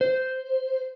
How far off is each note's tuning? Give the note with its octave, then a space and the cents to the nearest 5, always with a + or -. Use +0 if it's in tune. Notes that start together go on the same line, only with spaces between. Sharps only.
C5 -5